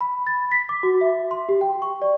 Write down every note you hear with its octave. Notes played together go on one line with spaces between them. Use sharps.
B5
A6
B6
D6
F#4
E5
C6
G4
G5
C#6
D5